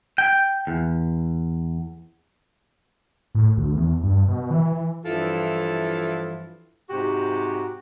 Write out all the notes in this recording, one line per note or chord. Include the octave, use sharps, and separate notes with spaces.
G5
E2
A2
D2
E2
G2
B2
E3
E3
G2 E3 F3 E4 F4 A4
G#2 C3 F#4 G4